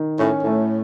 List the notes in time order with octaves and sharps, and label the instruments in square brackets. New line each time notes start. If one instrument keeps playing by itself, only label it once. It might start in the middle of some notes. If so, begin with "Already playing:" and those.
Already playing: [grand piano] D#3
[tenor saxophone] A2 [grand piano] C#4
[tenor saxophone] A2 [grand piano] A3